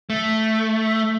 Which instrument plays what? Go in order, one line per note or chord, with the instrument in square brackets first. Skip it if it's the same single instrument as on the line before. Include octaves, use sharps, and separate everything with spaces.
[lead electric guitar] A3